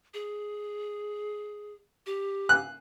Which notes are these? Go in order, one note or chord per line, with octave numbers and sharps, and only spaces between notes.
G#4
G4
F#6